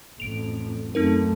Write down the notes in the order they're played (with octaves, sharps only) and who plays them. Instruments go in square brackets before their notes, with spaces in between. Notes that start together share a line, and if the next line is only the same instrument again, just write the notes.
[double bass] A1 F2 [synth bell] D7 F7
[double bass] F#2 A3 [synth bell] C4 D#4 A#4